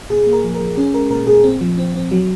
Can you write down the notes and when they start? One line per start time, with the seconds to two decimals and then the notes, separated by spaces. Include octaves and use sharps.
0.10 A#2 G#4
0.27 A#3
0.33 A#4
0.44 F3
0.54 A#4
0.60 F3
0.77 C#4 G#4
0.93 G#3 A#4
1.10 A#2 A#4
1.27 A#2 G#4
1.44 C4
1.61 F3
1.78 C4
1.95 C4
2.11 F#3